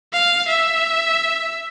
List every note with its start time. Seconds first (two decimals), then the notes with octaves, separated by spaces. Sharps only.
0.13 F5
0.48 E5